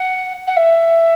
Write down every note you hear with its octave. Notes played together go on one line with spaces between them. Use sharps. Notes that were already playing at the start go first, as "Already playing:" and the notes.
Already playing: F#5
F#5
E5